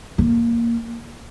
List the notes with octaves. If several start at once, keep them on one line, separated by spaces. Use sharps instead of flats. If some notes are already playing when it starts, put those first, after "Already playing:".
A#3